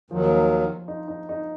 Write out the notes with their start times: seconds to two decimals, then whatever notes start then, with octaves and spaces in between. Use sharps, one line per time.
0.10 D#2 D#3 F3 F#3
0.88 D#4
1.08 D#4
1.29 D#4